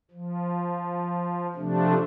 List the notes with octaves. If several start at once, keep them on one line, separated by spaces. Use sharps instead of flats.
F3
C3 F3 A3 D4